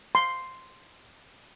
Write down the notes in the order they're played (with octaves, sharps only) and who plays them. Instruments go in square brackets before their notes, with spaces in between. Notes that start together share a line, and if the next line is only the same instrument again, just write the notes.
[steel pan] C6